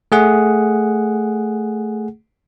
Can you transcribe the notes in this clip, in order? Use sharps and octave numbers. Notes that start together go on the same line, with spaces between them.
A3 G#4 F#5